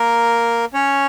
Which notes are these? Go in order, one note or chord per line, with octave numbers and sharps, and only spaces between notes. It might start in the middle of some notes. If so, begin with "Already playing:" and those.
Already playing: A#3 A#4
C#4 C#5